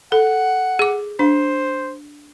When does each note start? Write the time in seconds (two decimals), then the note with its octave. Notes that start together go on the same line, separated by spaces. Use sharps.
0.12 A4 F#5
0.79 G#4 D6
1.19 D4 C5